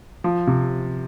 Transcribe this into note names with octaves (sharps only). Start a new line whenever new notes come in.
F3
C3